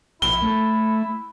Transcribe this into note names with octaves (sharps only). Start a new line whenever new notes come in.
A#1 E4 G7
A3